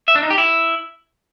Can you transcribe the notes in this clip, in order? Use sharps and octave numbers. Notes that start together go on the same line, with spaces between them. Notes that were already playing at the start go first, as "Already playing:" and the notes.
E5
D4
D#4
G4
E4